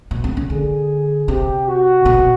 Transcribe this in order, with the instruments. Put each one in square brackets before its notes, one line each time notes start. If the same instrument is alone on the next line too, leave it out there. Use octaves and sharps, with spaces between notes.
[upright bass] B2
C3
C#3
[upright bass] D3 [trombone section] G#4
[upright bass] C3 [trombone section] G4
[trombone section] F#4
[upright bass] B2